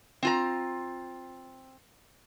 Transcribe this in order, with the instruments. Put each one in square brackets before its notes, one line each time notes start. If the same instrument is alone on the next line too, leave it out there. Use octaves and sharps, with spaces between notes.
[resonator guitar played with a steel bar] C4 F4 A#5